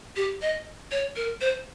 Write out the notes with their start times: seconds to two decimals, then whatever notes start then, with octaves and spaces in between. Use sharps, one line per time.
0.16 G4
0.42 D#5
0.91 C#5
1.16 A#4
1.41 C5